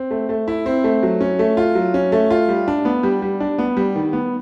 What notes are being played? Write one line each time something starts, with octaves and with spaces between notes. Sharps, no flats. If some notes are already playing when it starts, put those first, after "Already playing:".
Already playing: C4
A3
A3
E4
C4
A3
F#3
C#4
A3
F4
F#3
C#4
A3
F4
G3
D4
B3
G3
G3
D4
B3
G3
D#3
B3